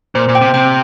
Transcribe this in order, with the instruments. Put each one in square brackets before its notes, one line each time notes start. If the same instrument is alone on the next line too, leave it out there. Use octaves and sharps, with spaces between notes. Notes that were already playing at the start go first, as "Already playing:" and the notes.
[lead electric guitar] A#2 [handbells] C5
[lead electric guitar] A#2
[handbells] G5
[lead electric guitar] C3
[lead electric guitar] C3 [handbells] G5